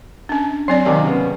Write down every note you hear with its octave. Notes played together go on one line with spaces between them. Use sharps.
C#4 D4
F#3 C4 D5 C7
D#2 C3 D#3
C#3 B3